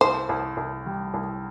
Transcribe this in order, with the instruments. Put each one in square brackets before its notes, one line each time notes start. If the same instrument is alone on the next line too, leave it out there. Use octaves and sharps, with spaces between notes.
[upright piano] C2 [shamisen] C5
[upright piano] C2
C2
G3
C2